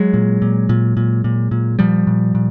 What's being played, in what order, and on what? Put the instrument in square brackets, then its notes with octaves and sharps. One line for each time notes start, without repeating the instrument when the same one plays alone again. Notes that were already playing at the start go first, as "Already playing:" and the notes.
Already playing: [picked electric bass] F#3 G#3
A#2
A#2
A#2
A#2
A#2
A#2
A#2 F3 G3
A#2
A#2